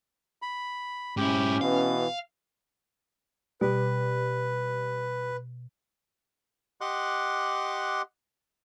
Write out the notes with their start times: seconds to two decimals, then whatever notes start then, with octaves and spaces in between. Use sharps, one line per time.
0.42 B5
1.17 G#2 C#4 E4 G4
1.61 B2 E3 F5
3.61 B2 G3 B4
6.81 G4 D#5 F#5 C6 D6 F#6